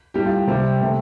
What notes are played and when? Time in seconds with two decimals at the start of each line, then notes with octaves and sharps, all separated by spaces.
0.14 A2 G3 D4 G4
0.25 F4
0.36 G4
0.47 C3 G3 C4 C5
0.81 C3 A3 C4